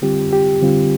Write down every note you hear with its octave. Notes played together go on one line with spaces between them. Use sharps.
D3 G3 C4 F4 G4
G4
D3 G3 C4 F4